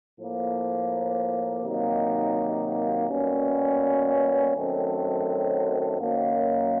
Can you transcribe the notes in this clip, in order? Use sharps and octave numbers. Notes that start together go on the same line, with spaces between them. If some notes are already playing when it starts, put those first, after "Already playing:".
A2 F3 A#3
C3 D#3 F#3 A#3 D#4
B2 G3 A#3 C#4
F#2 D#3 F#3 A3 C4
F#2 D#3 F#3 A#3